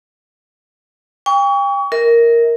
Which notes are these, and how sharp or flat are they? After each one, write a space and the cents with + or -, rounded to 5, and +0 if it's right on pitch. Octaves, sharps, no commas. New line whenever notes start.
G5 +35 C#6 +35
A#4 +0 E5 -45